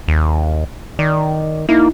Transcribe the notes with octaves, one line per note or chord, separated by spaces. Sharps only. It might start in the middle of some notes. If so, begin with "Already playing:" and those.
D#2
D#3 D5
A#3 D#4 E4